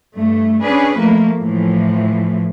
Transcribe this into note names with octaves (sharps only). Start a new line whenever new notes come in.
G2 A3
C#4 D4 G#4 B4
F3 A3 A#3
A2 E3 F3